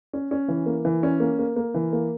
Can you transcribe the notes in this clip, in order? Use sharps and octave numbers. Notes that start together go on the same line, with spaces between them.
C#4
C#4
E3
A#3
E3
C#4
A#3
A#3
A#3
E3
A#3